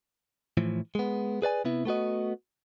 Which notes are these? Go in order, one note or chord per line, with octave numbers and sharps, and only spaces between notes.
A2 E3 F3
G#3 B3
G#4 B4 D5 G#5
C3 B3 E4
A3 B3 F#4 D#5